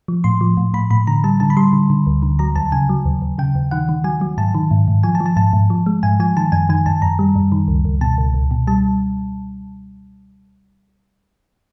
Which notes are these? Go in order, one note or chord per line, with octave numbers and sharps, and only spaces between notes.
F3
A2 C6
F3
A2
A2 B5
A2 B5
D3 A#5
G3 A5
D3 A5
B5
G3 C6
D3
D3
D2
D3
F#3 A#5
D#2 A5
C#3 G#5
F#3
D#2
D#2
C#3 G5
D#2
D#3 F#5
D#3
F#3 G#5
F#3
G#2 A5
D#3
G#2
G#2
F3 G#5
A5
F3
A5
G#2 A5
G#2
F3
G#3
G#2 G#5
F3 G#5
D#3 A5
F#2 G#5
D#3 G#5
F#2 A5
F#2 A#5
G3
F#2
D#3
C#2
C#2
B2 A5
C#2
C#2
B2
G3 A5